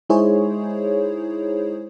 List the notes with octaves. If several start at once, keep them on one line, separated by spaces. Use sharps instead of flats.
G#3 D#4 E4 G#4 C5 C#5